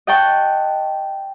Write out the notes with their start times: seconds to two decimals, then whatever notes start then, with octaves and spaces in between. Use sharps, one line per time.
0.07 D#5 F#5 G5 A5 C#6